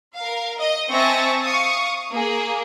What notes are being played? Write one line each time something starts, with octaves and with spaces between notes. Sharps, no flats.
A#4 F5
D#5
C4 E5 G#5 A5 C#6 A#6
F5 C#6 D#6
A#3 G#4